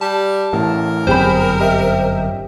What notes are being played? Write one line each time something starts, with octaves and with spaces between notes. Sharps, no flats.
G3 A5
A1 A2 A#4
G1 F#2 C4 G4 G#4 C5 B5
G4 D#5 E5